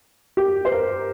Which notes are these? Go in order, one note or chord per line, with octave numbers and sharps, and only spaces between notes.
G4
C5
A#4